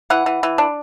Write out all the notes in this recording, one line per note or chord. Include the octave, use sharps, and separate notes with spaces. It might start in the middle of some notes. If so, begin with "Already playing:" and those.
E3 F#5
E3
E3
D4